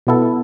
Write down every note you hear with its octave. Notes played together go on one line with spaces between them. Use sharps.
B2 B3 E4 A4